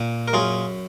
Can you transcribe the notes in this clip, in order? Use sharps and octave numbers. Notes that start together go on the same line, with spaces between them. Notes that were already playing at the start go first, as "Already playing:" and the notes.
Already playing: A#2
A#4
F#2 F4 G#4